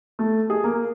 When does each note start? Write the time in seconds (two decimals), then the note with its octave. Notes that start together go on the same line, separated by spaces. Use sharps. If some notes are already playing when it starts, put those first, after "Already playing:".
0.19 A3
0.50 G#4
0.64 A#3